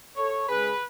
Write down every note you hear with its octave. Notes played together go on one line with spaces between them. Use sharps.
A4 C#5
C#3 G#3 G#4 B4